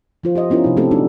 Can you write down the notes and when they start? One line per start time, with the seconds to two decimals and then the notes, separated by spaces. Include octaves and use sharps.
0.24 F3 F4 C5
0.35 G4 C5 D#5
0.50 B3 C#4 E4 F4 A#4
0.64 C3 F3 D#4
0.77 A3 A#3 C4 C#4 G4 A4
0.91 F#3 A#3 D4 D#4 F#4 G4